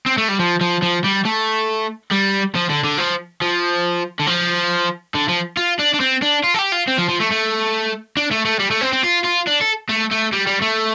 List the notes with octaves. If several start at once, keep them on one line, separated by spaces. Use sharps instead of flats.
C4
A3
G3
F3
F3
F3
G3
A3
G3
F3
D3
D3
F3
F3
D3
F3
D3
F3
F4
D4
D4
C4
D4
F4
A4
G4
F4
C4
F3
F3
A3
A3
D4
A3
A3
G3
A3
C4
C4
F4
F4
D4
A4
A3
A3
G3
G3
A3